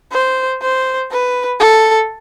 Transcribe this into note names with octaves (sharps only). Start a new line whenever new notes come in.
C5
C5
B4
A4